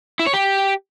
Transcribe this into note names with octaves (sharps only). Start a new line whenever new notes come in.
E4
C#5
G4